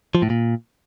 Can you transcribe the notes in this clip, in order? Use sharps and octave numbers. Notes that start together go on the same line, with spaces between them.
F3
A2
A#2